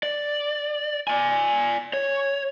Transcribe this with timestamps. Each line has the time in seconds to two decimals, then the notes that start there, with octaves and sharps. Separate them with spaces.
0.03 D5
1.08 D5 G#5
1.93 C#5